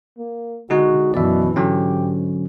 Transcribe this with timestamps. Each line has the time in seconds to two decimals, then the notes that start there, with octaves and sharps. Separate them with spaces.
0.18 A#3
0.70 D3 G#3 D#4 F#4 G#4
1.14 F#2 B2 E3 D5 E5
1.56 G#2 D3 F#3 C#4 G4